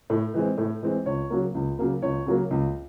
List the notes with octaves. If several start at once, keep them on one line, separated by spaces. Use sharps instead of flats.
A2
E3 G#3 C4
A2
E3 G#3 C4
C#2 C#5
C#3 F#3 A#3
C#2
C#3 F#3 A#3
C#2 C#5
C#3 F#3 A#3
C#2